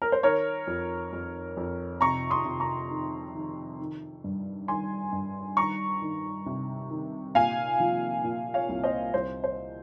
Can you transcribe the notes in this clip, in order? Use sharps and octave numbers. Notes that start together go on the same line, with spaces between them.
A#4
C5
D#3 A#4 C#5
F2
F2
F2
C3 A#5 C#6
C6 D#6
C3
A#5 C#6
D#3
D#3
D#3
G2
D#3 G#5 C6
G2
D#3 A#5 C#6
D#3
C3
D#3
A#2 F5 G#5
F3
A#2
C#5 F5
C2
C5 D#5
C2 C5
C5